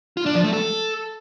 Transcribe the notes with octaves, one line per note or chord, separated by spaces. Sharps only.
F4
D4
F3
A3
A4